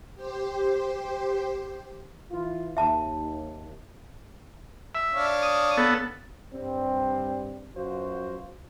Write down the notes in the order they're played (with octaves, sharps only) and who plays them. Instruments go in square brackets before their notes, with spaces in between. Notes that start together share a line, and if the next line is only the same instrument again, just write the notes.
[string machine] G4 C5
[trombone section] E3 E4 F4
[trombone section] D#2 [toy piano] E5 A5
[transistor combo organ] E5
[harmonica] D4 C#5 F5
[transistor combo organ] D#6
B3 A4
[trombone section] G2 G3 C4
F#2 F4 F#4 B4 C5